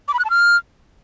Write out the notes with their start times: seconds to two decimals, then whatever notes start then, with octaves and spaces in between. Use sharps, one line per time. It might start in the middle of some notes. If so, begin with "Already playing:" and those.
0.08 D6
0.14 B5
0.19 F#6
0.25 A5
0.30 F6